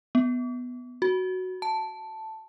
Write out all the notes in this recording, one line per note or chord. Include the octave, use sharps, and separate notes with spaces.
B3
F#4
A5